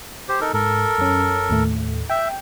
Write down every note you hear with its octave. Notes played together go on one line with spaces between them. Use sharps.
G4 C5
D#4 A4 A#4
G#2 A4 A#4
F#2 C#4
D#2 A2 A3
E5 G5